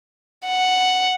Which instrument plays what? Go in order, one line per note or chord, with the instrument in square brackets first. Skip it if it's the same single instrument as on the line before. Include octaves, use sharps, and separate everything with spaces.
[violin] F#5